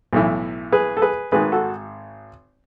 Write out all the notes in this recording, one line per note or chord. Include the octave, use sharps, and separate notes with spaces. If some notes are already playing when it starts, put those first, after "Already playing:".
B1 A2 E3
G#4 B4
A4
G#4 B4
G#1 G#2 D#3 G#4 B4
F#4 A4